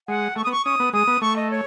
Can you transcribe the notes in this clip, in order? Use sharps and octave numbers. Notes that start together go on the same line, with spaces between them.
G#3 F#5
A3 C#6
D#6
B3
C#6
C#4 D#6
B3
G#3 D#6
B3
A3 C#6
D#5
C#5